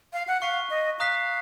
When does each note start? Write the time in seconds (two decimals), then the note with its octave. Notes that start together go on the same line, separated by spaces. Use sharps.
0.13 F5
0.28 F#5
0.41 F5 C#6 F#6 B6 D#7
0.70 D#5
0.99 F5 A#5 D#6 F#6 B6